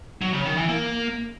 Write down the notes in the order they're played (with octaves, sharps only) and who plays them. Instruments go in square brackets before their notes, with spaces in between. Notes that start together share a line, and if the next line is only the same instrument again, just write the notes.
[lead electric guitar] F#3
C#3
D#3
E3
A#3